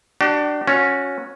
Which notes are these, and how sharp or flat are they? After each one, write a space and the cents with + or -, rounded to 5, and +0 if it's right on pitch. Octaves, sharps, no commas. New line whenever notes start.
D4 +15 G4 -45
C#4 +0 F#4 -25